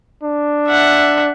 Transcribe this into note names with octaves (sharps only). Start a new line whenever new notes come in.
D4
E5 F#5